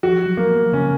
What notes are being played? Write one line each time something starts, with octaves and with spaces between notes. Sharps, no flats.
F3 F#4
F#3
A#3
C#3 C#4